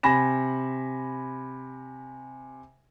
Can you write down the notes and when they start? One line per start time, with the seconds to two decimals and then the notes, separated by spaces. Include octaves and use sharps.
0.03 C3 G#5 B5 A#6 E7